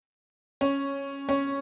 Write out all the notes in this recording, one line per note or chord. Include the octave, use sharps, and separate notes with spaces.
C#4
C#4